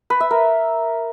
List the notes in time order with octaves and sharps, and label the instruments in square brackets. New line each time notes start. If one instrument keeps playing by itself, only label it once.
[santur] B4
E5
A#4